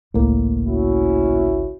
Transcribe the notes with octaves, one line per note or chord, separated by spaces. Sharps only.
G#1 C#2 A2 A#3
C#4 E4 F#4